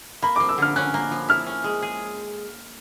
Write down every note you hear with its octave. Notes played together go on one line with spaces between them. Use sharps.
A#3 B5
F3 D6
E6
D3 F6
C#4 F#6
A#3
F3
E4 F6
C#4
G#3
G#4